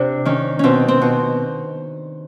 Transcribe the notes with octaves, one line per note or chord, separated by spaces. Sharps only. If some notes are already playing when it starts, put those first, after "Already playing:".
Already playing: C3 D4
D#3 C#4
B2 C4 C#4
C4
B2